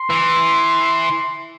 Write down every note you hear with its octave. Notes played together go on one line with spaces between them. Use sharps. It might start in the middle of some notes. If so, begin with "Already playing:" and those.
Already playing: C6
E3